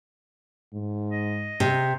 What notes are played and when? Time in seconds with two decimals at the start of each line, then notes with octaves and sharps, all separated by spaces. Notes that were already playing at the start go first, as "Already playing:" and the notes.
0.73 G#2
1.11 D#5
1.60 C3